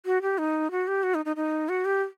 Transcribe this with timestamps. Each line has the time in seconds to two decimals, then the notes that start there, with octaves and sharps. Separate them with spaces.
0.06 F#4
0.22 G4
0.38 D#4
0.71 F#4
0.88 G4
1.03 F#4
1.15 D#4
1.25 D#4
1.36 D#4
1.69 F#4
1.85 G4